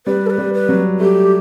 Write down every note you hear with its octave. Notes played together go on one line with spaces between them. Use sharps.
G3 B4
A4
B4
G3
B4
F#3
A3 G4